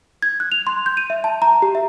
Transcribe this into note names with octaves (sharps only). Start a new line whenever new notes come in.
G#6
F#6
F7
C6
G6
D#7
E5
A5
A#5
G4
E5